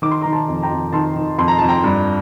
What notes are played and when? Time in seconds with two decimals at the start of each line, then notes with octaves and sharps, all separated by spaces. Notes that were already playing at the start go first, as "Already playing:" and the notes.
0.02 D#3 D6
0.11 C6
0.21 A#5 D6
0.25 D#3
0.33 A5 C6
0.48 F2
0.62 G5 A#5
0.71 F2
0.93 D#3 A5 C6
1.16 D#3
1.38 F2 C6
1.48 A#5
1.59 F2 A5
1.69 G5 A#5
1.84 G2